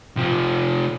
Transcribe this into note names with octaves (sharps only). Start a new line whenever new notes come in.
C3 F3